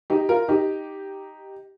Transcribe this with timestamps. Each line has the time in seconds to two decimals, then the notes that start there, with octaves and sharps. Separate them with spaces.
0.10 D#4 G4
0.29 F4 A#4
0.48 D#4 G4